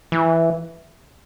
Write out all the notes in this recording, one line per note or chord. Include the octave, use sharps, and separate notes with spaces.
E3